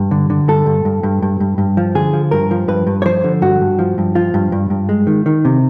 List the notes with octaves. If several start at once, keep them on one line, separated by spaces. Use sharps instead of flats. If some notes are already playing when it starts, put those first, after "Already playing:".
Already playing: G2
D3
D3
G2 A4
G2
G2
G2
G2
G2
G2
F3
D3 G#4
F3
G2 A#4
F3
G2 B4
G2
C#5
F3 C5
D3
G2 F#4
G2
F3
G2
F3 F4
G2
G2
G2
G#3
D#3
D#3
C3